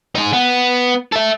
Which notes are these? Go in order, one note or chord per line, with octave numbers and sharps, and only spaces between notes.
D#4 G#4
B3
A4 E5